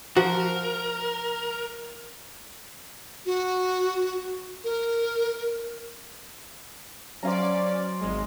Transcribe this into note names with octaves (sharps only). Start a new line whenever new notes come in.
F3 F#4 A#4
F#4
A#4
F#3 C#4 C5 D5 F5 A#5
G#1 G#3